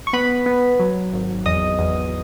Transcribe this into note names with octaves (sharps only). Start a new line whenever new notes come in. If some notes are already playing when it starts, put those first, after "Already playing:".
C#6
B3 B4 B5
B3
F#3
G#1
E2 D#5 D#6
E2